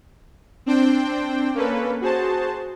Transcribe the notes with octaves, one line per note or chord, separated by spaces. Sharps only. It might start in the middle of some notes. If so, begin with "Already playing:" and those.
C4 D4 C5 G5
A#3 C#4 A4 B4
F#4 G#4 C5 A5